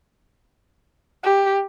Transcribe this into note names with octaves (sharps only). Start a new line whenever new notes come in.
G4